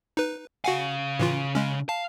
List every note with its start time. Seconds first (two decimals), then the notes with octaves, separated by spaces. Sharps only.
0.17 D#4 B4
0.64 C#3 F#4 F5 F#5 G#5
1.19 A2 E3 F4
1.55 G#3 C#4
1.89 F5 A5